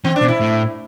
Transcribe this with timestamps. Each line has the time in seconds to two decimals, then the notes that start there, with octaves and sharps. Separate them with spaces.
0.04 E3 C4
0.16 D4
0.22 B2
0.28 E4
0.41 A2